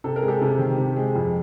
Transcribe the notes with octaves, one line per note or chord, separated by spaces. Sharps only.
C3 A4
A#4
G#3
G4 A4
C3
D#3
C3
G#3
F2